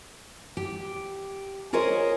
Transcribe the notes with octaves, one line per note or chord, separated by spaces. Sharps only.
G4
F4 G#4 A#4 C5 C#5 D#5